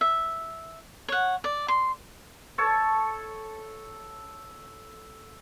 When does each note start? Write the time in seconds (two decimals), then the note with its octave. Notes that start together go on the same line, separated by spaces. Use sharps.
0.01 E5
1.08 C#5 F#5
1.44 D5
1.68 C6
2.58 A4 C#5 A5